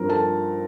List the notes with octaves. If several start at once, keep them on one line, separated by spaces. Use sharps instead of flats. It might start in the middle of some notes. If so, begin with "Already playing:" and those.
Already playing: G2 F3 C4 A#4 A#5
A4 A5